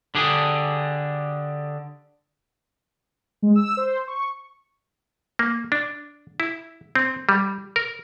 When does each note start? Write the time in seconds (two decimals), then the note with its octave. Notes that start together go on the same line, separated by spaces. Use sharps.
0.15 D3 D4 G4 G#4
3.42 G#3
3.55 E6
3.77 C5
4.08 C#6
5.39 A#3
5.72 D4
6.40 E4
6.95 C4
7.29 G3
7.76 A#4